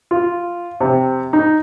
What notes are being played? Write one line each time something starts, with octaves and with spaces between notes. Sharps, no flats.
F4
C3
D#4